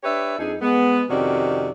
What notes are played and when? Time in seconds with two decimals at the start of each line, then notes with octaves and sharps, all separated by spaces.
0.04 D4 G4 B4 C#5 D5 E5
0.38 F2 D4 D#4 G#4
0.61 G#3 B3
1.10 F2 C3 D#3 C#4 F#4 D5